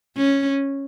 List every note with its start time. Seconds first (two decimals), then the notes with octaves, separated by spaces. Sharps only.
0.17 C#4